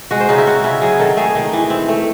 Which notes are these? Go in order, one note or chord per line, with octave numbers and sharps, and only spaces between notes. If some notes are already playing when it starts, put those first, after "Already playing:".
G#3 F#4
C5
C#3 D#4
E4
C4 F#4
C#3 E4
F#3 G#4
D#3 A4
A3 G#4
D#3
E3
C4
A3